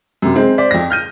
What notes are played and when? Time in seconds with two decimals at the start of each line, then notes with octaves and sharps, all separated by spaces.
0.22 F#2 C3
0.36 G#3 C4
0.58 C5 D5 B6
0.71 F2 A#6
0.90 F6 G6 D#7